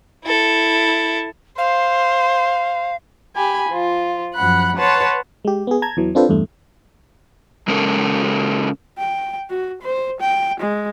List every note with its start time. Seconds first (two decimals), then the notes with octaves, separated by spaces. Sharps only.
0.24 E4 A4
1.58 C5 F5
3.36 G4 G#5 B5
3.70 F3 F4
4.35 F#2 F3 F#5 B5 F#6
4.76 B4 C#5 F#5 A5 C6
5.45 G#3 G4
5.67 B3 G#4
5.82 A5 A#5 G#6
5.97 E2 E3 F#3
6.15 C4 D4 F4 A4 B4 C5
6.29 E2 G2 A3
7.68 C#3 G#3 C#4 A4 A#4
8.98 G5
9.50 F#4
9.82 C5
10.21 G5
10.60 G#3